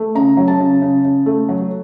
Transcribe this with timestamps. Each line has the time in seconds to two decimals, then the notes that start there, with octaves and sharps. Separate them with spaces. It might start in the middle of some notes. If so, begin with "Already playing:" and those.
Already playing: A3
0.15 C#3 A#5
0.37 F#3
0.48 A5
0.60 C#3
0.82 C#3
1.04 C#3
1.26 A3
1.49 F#3